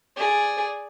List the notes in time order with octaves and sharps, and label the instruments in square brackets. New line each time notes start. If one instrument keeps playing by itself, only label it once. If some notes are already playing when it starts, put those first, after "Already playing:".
[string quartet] G#4 D5